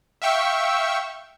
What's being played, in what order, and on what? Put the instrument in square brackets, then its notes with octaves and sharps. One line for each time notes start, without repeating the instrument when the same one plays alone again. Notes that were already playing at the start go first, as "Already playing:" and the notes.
[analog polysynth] E5 F5 G5 C#6 E6